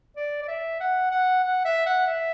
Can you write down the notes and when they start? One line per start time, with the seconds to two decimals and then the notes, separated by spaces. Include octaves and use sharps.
0.16 D5
0.43 D5
0.48 E5
0.80 F#5
1.11 F#5
1.43 F#5
1.65 E5
1.86 F#5
2.07 E5